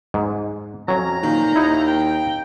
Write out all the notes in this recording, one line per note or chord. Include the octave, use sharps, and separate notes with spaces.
G#2
F2 F#3 C#4 A#5
A#2 D#3
D#2 D#4 E4
G5